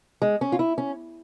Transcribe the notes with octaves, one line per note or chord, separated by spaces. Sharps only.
G#3
C#4
F4
E4
C#4